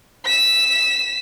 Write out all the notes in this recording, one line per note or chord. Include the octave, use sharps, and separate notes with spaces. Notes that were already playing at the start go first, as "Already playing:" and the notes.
B6 E7